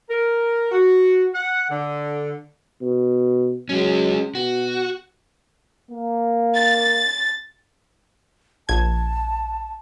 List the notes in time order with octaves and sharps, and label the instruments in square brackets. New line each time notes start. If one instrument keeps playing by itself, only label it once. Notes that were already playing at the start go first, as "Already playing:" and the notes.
[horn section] A#4
F#4
F#5
D3
[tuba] B2
[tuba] F#3 [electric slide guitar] G#3 C#4
[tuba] B2 [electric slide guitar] F#4
[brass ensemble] A#3
[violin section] A6
[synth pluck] A#1 G#6 [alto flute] A5